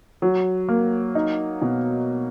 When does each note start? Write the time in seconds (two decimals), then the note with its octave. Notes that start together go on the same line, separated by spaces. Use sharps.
0.22 F#3
0.68 A#3
1.15 D#4
1.62 B2